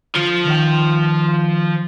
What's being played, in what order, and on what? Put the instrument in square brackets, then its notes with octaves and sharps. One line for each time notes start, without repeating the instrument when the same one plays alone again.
[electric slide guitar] D3 [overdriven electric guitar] F3
[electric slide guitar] D#3 G5